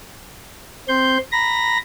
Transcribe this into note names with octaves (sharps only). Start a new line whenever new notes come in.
C4 C6 G6
A#5 B5 A#6